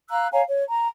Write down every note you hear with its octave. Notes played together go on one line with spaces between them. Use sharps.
F5 A#5 E6 F#6
C#5 F5 G#5 A#5
C#5
A#5